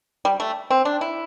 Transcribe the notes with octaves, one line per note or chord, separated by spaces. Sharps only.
G3
A3
C4
D4
E4